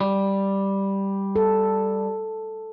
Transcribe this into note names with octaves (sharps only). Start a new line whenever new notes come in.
G3
A4